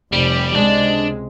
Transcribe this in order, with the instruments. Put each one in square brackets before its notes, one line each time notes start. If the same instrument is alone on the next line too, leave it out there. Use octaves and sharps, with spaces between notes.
[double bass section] F1 [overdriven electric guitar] G3
[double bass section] C#2 C3 G#3 [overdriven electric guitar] D4